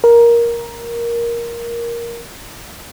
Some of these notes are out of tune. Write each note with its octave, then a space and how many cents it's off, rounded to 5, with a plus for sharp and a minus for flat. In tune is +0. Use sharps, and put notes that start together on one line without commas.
A#4 +10